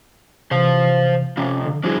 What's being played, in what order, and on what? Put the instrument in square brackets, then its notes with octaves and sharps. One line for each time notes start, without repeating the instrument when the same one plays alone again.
[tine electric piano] C3 E3 [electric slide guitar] C5 F5
[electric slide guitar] C3 F3 F4 [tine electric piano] C#4
[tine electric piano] D3
[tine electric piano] F3 G3 E4 [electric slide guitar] D4 F#4 G#4